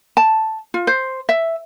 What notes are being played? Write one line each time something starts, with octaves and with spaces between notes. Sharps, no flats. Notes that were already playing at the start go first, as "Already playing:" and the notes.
A5
F4
C5
E5